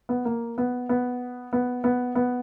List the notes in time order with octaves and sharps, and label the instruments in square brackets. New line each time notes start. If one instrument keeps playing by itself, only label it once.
[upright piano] B3
A#3
B3
B3
B3
B3
B3